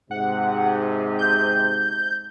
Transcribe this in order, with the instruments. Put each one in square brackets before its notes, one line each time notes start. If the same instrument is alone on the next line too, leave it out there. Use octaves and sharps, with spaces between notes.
[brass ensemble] G#2 C3 [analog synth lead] F#5
[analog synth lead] G6